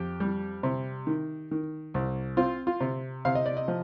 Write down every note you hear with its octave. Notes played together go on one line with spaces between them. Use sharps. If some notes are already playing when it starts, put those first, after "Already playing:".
Already playing: F2 G4
G3
C3
D#3
D#3
C2
C4 F4
F4
C3
C3 F5
D#5
D5
D#5
F3